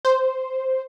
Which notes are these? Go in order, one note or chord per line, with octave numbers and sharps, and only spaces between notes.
C5